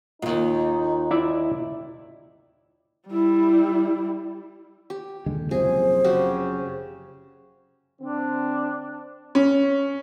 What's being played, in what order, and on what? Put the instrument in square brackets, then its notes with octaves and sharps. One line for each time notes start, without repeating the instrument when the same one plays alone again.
[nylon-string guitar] D#2 G#2 [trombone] D#4 [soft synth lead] F4
[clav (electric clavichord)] E4 D5 E5
[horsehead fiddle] G3 E4
[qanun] G4
[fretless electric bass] D#2 D3 G#3
[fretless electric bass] F#1 C3 F3 [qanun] G#4 [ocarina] C5
[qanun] C#3 F#4 G4
[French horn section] D3 C4 [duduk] D4
[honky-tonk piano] C#4